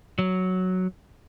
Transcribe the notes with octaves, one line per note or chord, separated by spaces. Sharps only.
F#3